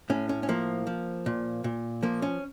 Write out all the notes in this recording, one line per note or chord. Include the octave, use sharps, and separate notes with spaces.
A2 C#4
C#4
C#4
F3 A#3
F3
A#2
A#2
F3 A#3
C#4